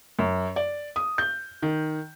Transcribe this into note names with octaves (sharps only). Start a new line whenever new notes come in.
F#2
D5
D#6
G6
D#3